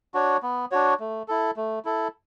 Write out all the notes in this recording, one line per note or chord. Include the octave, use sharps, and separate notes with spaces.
D4 F#4 C#5
B3
D4 F#4 C#5
A3
E4 A4
A3
E4 A4